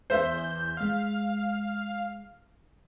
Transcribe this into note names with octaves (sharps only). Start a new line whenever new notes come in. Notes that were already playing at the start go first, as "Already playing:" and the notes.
E2 C5 E5 G6
G#3 F5 F6